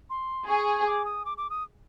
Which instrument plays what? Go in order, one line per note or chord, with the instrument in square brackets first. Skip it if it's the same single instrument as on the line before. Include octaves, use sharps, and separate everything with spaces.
[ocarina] C6
[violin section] G#4 [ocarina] C#6
[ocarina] D6
D#6
D6
D6
D#6